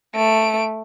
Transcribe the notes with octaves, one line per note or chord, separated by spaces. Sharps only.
A3 D7